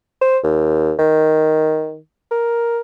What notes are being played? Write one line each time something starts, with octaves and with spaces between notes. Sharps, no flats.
C5
D#2
D#3
A#4